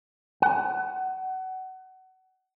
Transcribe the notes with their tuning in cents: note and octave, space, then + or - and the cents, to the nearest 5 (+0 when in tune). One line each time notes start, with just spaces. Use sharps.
F#5 +25